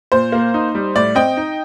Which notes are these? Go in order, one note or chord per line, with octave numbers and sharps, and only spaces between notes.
A#2 C5
A#3
D#4
G3
A2 D5
C4 D#5 G5
D#4